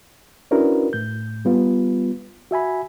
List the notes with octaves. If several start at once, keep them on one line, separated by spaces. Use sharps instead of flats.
C#4 D4 E4 F#4 A#4 B4
A2 G6
G3 B3 F4 B4
F#4 E5 G#5 B5